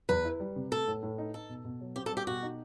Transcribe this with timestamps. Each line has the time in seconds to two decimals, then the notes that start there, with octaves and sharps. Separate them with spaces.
0.09 E2 B4
0.25 E4
0.40 G3
0.56 C3
0.72 A3 A4
0.87 A2
1.03 A2
1.18 D#4
1.34 D#4 A4
1.49 B2
1.65 B2
1.81 F#3
1.96 C4 G4
2.06 A4
2.12 G3
2.17 G4
2.27 B2 F#4
2.42 D#4